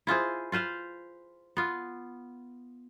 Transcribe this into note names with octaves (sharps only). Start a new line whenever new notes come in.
E4 F4 G#4 C5
F4 B4 C5 F5
B3 F4